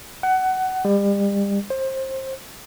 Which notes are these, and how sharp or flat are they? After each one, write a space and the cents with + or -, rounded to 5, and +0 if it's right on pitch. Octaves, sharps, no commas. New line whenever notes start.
F#5 +20
G3 +35
C5 +25